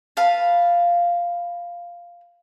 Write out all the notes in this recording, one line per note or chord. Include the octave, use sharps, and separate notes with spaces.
B4 F5 A5